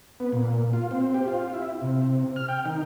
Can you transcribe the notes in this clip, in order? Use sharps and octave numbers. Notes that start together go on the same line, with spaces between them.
B3
A#2
F4
C4
G4
F4
E4
C3
F6
G5
D#3